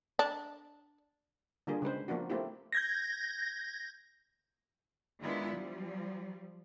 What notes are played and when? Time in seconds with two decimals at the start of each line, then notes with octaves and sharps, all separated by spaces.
0.19 D4
1.67 D3 G3 A#3 F4 G#4 A#4
1.82 C#3 G#3 B4 C5
2.08 F3 A#3 B3 D4 F#4
2.30 A3 A#3 C4 E4 F4 G4
2.73 G6 G#6 A#6
5.21 D#3 G#3 B3 D4 E4 F4
5.55 F3 G3